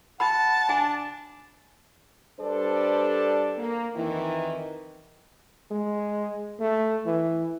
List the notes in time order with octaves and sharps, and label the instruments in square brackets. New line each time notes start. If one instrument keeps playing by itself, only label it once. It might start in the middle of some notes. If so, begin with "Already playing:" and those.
[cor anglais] F#5 [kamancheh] A5 [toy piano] B5
[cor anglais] D4 [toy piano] G#5
[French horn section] G3 D4 A4 B4 C5 D5
A#3
F2 D#3 E3
[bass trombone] G#3
A3
E3